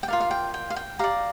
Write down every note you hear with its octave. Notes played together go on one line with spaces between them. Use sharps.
G5
F4 A#4 D5 F5
F5
G5
G5
F5
G5
G4 D5 F5 A#5